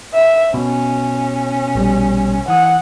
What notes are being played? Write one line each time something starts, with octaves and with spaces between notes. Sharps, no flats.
E5
B2 C#4
A#1 B2 G3
E3 F#5 G#5 D#6